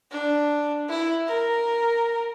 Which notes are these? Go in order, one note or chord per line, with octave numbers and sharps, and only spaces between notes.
D4
E4
A#4